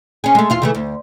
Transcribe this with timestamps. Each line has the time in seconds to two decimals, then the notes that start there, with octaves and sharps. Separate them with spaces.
0.24 C#4 G#4
0.35 G#3 A3
0.50 E2 F4 F5
0.62 C#3 E3 A3
0.75 D2